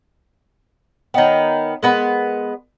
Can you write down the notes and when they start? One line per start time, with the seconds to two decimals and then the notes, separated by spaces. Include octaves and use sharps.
1.14 D#3 B3 C#5 D#5 G5
1.83 G#3 B3 A#4 B4